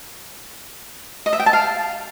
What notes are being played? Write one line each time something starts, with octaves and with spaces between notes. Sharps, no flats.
D#5
E5
G5
A5
F5